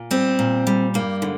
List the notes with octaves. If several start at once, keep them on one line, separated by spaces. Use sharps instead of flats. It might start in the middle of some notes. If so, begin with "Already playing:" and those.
Already playing: A#2
G3 C4
A#2
G3
G2 A#3
D3